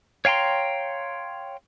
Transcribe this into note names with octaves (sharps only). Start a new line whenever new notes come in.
C#5 F5 G5 A#5 C6